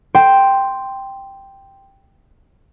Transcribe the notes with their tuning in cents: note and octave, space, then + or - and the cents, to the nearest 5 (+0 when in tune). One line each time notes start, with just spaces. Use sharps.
G5 +0 C6 +0